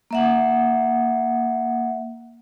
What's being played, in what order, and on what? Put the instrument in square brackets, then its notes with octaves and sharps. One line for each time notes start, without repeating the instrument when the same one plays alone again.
[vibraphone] A#3 E5 F#5